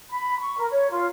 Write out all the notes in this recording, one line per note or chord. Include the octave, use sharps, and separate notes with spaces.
B5
C#6
A#4
C#5
F4